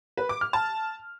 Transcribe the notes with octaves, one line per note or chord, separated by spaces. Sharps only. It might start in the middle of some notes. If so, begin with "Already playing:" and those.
B4
D6
F6
A5